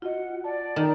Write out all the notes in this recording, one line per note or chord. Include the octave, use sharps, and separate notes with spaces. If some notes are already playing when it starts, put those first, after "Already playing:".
F4 F#4 D#5 F#5
D5 A5
D#3 A#3 A4